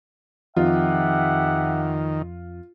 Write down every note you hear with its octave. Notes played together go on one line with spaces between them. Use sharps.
F2 D#3 F4 G4 E5 F#5